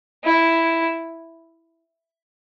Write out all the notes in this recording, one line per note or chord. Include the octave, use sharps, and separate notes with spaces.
E4